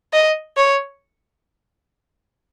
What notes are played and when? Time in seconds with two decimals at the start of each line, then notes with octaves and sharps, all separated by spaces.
0.13 D#5
0.57 C#5